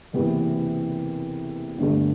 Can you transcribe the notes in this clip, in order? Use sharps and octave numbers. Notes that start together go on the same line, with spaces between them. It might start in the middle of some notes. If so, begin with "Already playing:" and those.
F#1 E2 C3 E3 B3
G1 G2 D3 A3